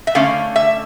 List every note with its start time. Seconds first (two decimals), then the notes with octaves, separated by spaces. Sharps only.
0.07 E5
0.15 D3 A3 C#4 F5
0.56 E5